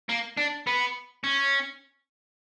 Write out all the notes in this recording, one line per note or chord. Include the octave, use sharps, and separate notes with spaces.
A#3
D4
B3
C#4